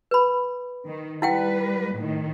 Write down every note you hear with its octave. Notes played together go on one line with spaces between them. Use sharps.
B4 B5
D#3
G3 E4 B4 F#5 G5
A2 D#3